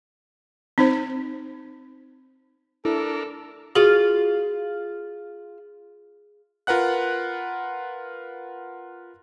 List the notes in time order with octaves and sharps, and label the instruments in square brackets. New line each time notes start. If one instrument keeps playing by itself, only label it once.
[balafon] C4 D#4 C5
[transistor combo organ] D4 A#4 [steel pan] E4 [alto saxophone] A4
[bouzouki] F4 F5 [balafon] F#4 [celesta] G#4 F#7
[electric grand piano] F4 A#4 B4 F#5 F#6